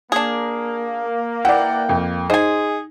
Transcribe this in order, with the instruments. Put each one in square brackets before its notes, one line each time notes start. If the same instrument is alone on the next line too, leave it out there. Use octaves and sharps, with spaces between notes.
[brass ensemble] A#3 [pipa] D4 G#4
[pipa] E3 [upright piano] D5 F#5 [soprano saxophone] G5
[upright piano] F2
[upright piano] D#4 [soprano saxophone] G#4 [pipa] C5 G#5